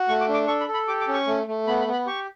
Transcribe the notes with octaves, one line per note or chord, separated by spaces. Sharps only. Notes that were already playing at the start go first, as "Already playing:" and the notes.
Already playing: F#4
A3 C#6
D6
D4
D6
A4 C#6
B5
A4
B5
G4 D6
D6
C#4
C#6
A3
A3
B3 B5
B5
B3
B5
G4 C#6